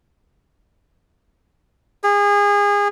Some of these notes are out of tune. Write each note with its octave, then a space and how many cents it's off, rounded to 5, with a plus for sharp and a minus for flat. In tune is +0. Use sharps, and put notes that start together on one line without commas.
G#4 -30